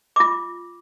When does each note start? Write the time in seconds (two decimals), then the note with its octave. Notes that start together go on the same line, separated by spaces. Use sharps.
0.16 F4 D6